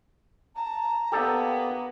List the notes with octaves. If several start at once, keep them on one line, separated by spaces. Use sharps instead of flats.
A5 A#5
A#3 B3 G4 A4 D5